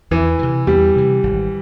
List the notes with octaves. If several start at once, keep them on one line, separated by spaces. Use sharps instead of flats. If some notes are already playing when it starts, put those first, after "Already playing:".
E2 E3
C3 E3
E2 G3
C3 E3
G#1